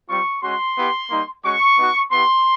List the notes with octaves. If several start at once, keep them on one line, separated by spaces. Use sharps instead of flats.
G3 C4 F4 C#6
G#3 C#4 F#4 C6
B3 E4 G4
G3 A#3 D#4
G#3 C#4 F#4 C#6
B3 D#4 F#4
B3 E4 G4 C6